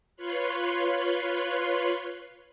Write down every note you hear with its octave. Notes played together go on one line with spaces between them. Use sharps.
F4 B4 C#5 C6 F#6